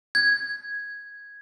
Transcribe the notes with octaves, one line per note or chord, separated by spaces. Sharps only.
G#6